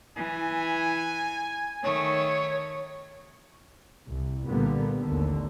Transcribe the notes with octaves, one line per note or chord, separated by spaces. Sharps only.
E3 G#5
D#3 A3 C#5
C2
A#2 D3 G3 A#3 B3
A1 D#2 D3